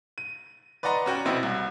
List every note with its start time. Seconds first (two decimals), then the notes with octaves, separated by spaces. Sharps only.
0.18 D#7
0.83 B4 D5 D#5 F#5 A#5 C6
1.06 C#4 F#4 G5
1.25 F1 B2 C4 E4 D#5
1.43 C2